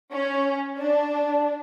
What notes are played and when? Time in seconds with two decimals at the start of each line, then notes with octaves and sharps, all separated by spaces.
0.13 C#4
0.78 D4